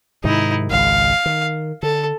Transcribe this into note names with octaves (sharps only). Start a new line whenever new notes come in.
G#2 C3 D#3 D#4 E4
G#1 C#2 F5
D#3
D3 A4